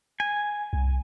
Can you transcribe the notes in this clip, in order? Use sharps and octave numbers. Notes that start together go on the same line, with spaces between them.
G#5
C2